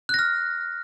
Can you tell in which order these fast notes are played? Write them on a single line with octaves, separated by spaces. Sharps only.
F#6 A#6 F6